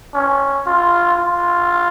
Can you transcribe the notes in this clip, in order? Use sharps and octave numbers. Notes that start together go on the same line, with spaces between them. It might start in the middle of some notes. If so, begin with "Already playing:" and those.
C#4
F4
F4